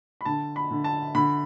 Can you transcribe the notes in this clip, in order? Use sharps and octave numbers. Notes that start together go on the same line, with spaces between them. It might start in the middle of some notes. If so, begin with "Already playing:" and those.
B5
D3 A5
B5
D3
A5
D3 B5